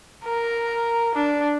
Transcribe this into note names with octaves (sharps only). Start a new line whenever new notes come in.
A#4
D4